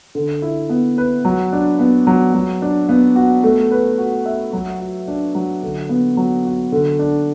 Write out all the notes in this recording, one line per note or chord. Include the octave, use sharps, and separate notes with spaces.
D3
E4
B3
B4
F#3
D4
B3
F#3
F#3
D4
B3
F#4
A3
B4
F#4
E5
F#3
F#4
D4
F#3
D3
B3
F#3
F#4
D3
D4